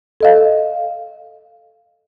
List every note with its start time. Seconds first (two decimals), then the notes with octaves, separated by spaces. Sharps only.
0.21 A4 D#5 F5